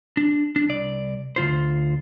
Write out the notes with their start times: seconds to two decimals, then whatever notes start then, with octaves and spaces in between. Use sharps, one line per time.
0.17 D4
0.56 D4
0.68 C2 D5
1.36 D2 C3 F4 C5